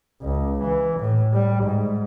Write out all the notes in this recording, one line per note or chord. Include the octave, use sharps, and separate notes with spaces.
C#2
E3
A2
G3
G#2